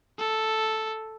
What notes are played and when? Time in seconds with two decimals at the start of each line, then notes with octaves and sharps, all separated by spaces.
0.19 A4